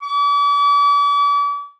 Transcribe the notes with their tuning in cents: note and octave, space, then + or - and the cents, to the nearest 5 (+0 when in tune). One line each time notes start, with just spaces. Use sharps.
D6 -40